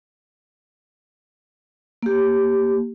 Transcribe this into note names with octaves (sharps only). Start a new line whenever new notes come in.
A#3 G4